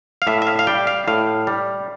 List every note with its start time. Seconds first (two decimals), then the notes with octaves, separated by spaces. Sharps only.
0.22 F5
0.27 A2 E5
0.42 E5
0.47 F5
0.59 F5
0.67 G3 G5
0.87 F5
1.08 A2 F5
1.47 G3